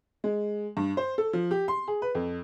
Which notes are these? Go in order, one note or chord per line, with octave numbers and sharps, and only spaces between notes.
G#3
G2
C5
A4
F3
G4
C6
G#4
B4
F2